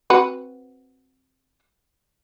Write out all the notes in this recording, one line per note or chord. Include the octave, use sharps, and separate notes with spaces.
C4 F#4 B4